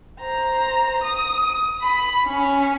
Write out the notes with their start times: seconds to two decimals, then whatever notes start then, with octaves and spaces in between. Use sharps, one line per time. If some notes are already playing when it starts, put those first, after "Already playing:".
0.21 C5 A#5
1.02 D#6
1.82 B5
2.27 C#4